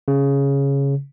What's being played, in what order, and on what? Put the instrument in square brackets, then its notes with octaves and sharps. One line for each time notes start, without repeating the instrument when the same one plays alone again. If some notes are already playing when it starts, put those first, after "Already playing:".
[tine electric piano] C#3